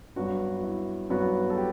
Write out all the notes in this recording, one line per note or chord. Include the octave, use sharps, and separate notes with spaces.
G2 F#3 B3 F#4
F#4
E4
G2 F#3 B3 F#4
A4
G4